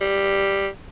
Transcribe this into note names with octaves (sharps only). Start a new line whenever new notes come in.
G3